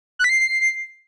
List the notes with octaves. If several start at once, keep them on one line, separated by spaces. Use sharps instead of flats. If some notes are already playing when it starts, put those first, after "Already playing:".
F#6
B6
C7